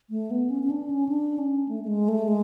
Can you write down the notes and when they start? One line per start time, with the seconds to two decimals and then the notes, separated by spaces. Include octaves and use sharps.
0.10 A3
0.31 B3
0.50 C#4
0.63 C#4
0.70 D4
0.90 C#4
1.09 D4
1.38 C#4
1.69 A3
1.84 A3
1.88 G#3
2.08 A3
2.28 G#3